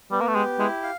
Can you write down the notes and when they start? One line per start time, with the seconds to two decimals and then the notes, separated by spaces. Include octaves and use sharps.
0.11 G3 B3
0.21 A#3
0.28 A3
0.35 G#3 G4
0.59 G#3 E4
0.83 F5